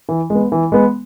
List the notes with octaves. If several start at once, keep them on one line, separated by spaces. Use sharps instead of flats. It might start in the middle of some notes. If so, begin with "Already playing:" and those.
E3
G#3 B3
E3
G#3 B3